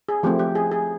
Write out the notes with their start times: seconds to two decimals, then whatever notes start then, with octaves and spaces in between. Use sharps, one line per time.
0.09 G#4
0.23 F3 A3 C4 G4
0.39 G4
0.55 G#4
0.72 G#4